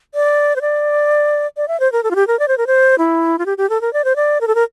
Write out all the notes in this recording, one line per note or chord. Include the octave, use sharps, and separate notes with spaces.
D5
C5
D5
D5
E5
C5
A#4
A4
F4
G4
A#4
D5
C5
A#4
C5
E4
F4
G4
G4
A4
A#4
D5
C5
D5
A#4
A4
A#4